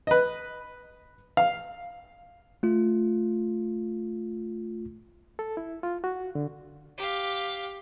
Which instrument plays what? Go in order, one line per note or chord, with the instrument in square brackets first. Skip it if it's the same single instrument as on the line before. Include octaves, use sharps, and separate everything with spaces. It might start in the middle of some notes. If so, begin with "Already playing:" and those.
[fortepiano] B4 D#5
F5
[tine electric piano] A3 F4
[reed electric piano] A4
E4
F4
F#4
D3
[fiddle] G4 F5